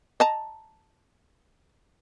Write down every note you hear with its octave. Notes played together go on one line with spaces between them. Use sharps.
D#5 A5 A#5